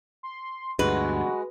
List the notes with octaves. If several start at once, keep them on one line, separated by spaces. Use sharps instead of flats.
C6
D2 G2 G#3 F#4 B4